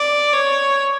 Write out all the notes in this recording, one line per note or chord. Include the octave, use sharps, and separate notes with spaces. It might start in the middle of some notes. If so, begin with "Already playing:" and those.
Already playing: D5
C#5